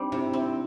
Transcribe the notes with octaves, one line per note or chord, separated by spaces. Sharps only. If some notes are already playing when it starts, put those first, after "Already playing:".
Already playing: G3 C4 D4 D#4
C3 E4
C4 E4